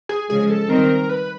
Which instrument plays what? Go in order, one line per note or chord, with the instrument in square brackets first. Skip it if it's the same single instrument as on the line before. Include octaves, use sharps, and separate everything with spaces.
[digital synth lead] G#4
[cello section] C#3 F3 G#3 [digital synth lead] G#4
[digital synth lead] A4
[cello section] D#3 G3 C4 D#4 [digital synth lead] A#4
[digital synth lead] B4